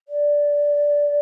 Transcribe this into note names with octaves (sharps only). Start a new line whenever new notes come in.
D5